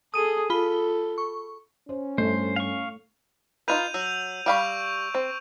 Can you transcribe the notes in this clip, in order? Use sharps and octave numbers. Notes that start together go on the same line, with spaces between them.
G#4 A4 D#6 D#7
F4 A4 B5 G7
C#6
C#4 C5
G2 A3 C5
F5 C#6
D#4 F4 B4 G6 D#7 F7
F#3 E6
G3 F5 B5 C#6 G6 D7
C4